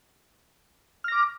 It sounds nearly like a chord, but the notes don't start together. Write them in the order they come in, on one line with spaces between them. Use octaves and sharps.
F6 A#6 D6